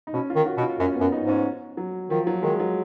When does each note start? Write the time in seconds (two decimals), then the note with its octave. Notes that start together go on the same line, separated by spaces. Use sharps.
0.07 D#4
0.14 B2 C#4
0.30 F4
0.36 D#3
0.46 F#4
0.58 B2
0.63 F4
0.79 F#2 C#4
0.95 B3
1.01 F#2
1.12 D#4
1.23 G#2
1.29 C#4
1.77 F#3
2.10 D#3 F3
2.27 F#3
2.43 D#3 G#3
2.60 F#3